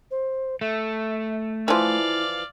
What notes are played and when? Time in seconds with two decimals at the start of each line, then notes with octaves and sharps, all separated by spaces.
0.11 C5
0.61 A3 E5
1.68 E3 F3 E4 D5 F5